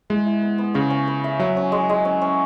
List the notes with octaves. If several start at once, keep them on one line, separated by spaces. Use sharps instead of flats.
G#3 E4
E4
B3
B3
C#3 C#5
C#4
B4
E5
F#3 E5
C#4
G#3
G#3
C#4
C#4